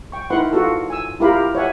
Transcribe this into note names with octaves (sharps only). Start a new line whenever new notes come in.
G5 C#6
D#4 E4 A#4 B4 F#5 C6
F4 F#4 A4 B4
G#5 E6
E4 F4 G4 A#4 F5 B5
C#5 D#5 E5 F#5 G#5